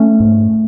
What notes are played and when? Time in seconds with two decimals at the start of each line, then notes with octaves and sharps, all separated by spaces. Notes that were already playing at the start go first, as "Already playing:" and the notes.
Already playing: A3 C#4
0.20 G#2